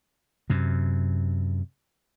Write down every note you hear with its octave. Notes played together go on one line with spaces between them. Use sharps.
F#2 C3